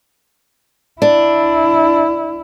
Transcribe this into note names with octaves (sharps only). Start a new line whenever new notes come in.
D4 E4